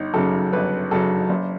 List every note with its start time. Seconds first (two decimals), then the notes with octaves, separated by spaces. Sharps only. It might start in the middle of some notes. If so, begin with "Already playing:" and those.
Already playing: G1 D#4
0.14 F#2 C#3 F#3 A4
0.53 G1 B4
0.91 F#2 C#3 F#3 A4
1.29 F#1